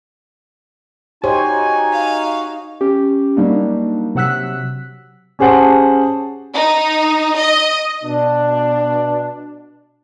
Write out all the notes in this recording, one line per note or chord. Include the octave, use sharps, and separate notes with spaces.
D#4 F#4 G4 C5 C#5 G#5
F5
C#4 G4
F#3 G3 A#3 D4 D#4
C3 F#3 F#5 E6 F#6 B6
C#4 G4 G#4 C5 F#5 A5
D#4
D#5
B2 D4